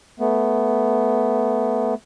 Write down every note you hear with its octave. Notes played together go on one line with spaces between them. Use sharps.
A3 B3